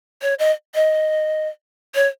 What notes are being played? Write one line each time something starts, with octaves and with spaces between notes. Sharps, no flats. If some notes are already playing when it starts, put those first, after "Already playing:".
C#5
D#5
D#5
C#5